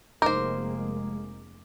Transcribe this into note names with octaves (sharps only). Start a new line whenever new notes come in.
F1 G#3 A#3 D#4 A#4 C5 D6